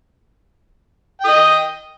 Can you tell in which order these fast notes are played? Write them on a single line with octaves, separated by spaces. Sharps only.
G5 D#6 D#5